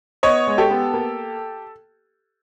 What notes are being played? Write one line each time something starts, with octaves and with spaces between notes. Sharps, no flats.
B3 C#5 D#5
G#3
G4 A4
B3
A#3